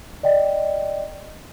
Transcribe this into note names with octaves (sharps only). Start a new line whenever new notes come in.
D5 D#5 G5